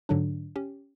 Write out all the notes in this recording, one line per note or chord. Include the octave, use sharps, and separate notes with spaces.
G#2 D3 F#3 D4
C#4 G4